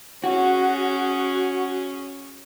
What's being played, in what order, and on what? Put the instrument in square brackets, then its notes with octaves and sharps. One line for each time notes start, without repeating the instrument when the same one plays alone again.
[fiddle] C#4 G#4 [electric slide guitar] F#4